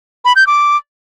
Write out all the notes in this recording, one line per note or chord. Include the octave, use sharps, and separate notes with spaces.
B5
G6
D6